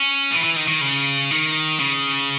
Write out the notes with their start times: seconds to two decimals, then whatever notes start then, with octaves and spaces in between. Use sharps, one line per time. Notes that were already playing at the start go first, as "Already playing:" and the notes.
Already playing: C#4
0.31 E3
0.43 E3
0.56 D#3
0.68 D#3
0.81 C#3
1.31 D#3
1.79 C#3